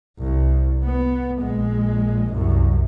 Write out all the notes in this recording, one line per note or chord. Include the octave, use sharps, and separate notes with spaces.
C2
B3
A#1 G#3
C2 F#2